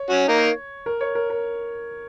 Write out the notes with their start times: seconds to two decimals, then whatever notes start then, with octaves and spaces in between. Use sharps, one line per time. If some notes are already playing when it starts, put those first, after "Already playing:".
Already playing: C#5
0.10 C#4 F#4
0.29 A#3 D#4
0.86 A#4
1.01 C#5
1.15 A#4
1.30 A#4